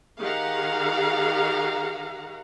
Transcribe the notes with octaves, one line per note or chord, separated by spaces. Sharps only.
D#3 G4 G#4 F5 F#5 A#5